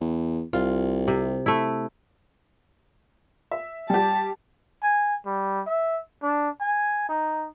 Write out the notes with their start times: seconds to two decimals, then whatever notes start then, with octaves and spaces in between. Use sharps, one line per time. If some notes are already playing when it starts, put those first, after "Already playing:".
0.01 E2
0.53 C2 F4
1.08 C3
1.46 A3 E4
3.51 E5
3.90 G3 G4 A5
4.83 G#5
5.26 G3
5.67 E5
6.22 D4
6.61 G#5
7.09 D#4